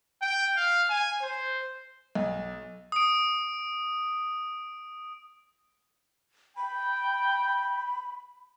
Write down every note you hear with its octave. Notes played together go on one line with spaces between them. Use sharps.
G5
F5
G#5
C5
B1
D#6 D7
G5 B5